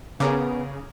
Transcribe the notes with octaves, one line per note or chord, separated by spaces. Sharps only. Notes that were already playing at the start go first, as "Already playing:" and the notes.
C#3 B3 G#4 A#4 D6